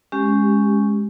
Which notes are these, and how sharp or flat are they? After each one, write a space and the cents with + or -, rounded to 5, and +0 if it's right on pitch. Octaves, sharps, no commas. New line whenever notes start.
G#3 +0 C#4 +0 G4 -5